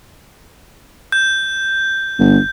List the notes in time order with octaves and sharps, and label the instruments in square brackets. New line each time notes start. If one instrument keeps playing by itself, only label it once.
[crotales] G6
[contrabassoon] G1